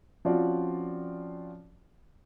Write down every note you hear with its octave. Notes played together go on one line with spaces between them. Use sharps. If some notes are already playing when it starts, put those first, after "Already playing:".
F3 C4 C#4 F4 F#4 D5